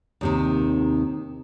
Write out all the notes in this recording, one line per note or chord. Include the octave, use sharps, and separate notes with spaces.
D#2 C3 D#3